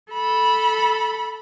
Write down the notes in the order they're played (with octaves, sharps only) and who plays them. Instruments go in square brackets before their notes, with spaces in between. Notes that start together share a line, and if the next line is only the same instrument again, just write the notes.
[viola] A4 B5